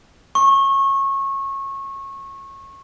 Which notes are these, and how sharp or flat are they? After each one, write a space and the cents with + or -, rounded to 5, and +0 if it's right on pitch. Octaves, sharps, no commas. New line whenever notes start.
C#6 -20